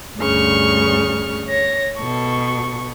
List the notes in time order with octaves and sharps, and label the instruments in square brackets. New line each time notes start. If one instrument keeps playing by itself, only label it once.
[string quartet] D2 G2 C#3 C#6 F6
C#5 A#6
B2 A4 C#6